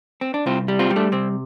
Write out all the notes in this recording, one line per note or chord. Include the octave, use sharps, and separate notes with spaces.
C4
D4
C2 C4 F4
G3
C4 F4
G3
A3 D4
C3 C4